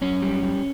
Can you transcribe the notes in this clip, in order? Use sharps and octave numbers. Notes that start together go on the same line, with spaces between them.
F#2 C#4
G3
G3